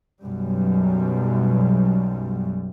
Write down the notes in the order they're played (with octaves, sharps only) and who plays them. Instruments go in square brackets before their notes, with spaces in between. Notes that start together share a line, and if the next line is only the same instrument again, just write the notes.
[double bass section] B1 F#2 G3